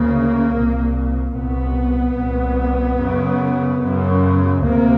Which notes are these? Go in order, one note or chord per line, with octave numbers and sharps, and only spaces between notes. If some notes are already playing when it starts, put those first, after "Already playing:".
Already playing: D2 C#3 A#3
C2 A#2
C2 A#2 B3
C2 A#2
F#2 C#3
F#2 C#3
D2 C3 A#3